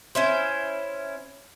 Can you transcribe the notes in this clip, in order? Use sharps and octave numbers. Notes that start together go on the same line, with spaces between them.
C#4 E4 C5